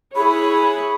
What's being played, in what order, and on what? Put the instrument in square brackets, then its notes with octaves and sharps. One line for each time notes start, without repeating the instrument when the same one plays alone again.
[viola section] E4 G#4 C#5 [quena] B5